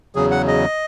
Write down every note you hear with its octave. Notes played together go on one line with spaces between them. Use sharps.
E2 C#3 F#3 G#4
F#5
D#5